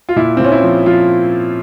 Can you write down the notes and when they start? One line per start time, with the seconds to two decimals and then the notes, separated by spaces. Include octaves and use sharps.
0.09 F4
0.16 A#2 E4
0.37 C4
0.40 A#2 C#4
0.52 E4
0.63 F3
0.86 F3 F4